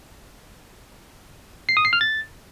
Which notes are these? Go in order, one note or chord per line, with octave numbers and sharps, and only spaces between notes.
C7
D#6
C7
F6
A6